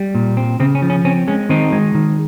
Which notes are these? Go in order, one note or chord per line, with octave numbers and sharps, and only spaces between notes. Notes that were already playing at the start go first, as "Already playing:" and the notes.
Already playing: G3
A#2
C4
C#3 C4
C#4
F3
C#4
C4 C#4
G#3 C#4
D#3 C4 D#4
G#3
D#3